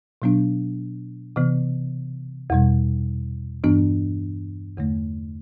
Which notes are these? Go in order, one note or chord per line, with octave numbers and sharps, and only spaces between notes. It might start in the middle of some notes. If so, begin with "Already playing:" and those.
B2 F#3 B3 D4
C3 E3 B3
E2 B2 G3
G2 E3 B3 D4
E2 D3 A3